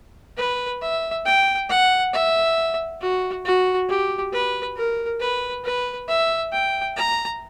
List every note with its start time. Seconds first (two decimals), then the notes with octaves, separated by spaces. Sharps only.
0.38 B4
0.82 E5
1.26 G5
1.70 F#5
2.14 E5
3.01 F#4
3.45 F#4
3.89 G4
4.33 B4
4.76 A#4
5.20 B4
5.64 B4
6.08 E5
6.52 G5
6.96 A#5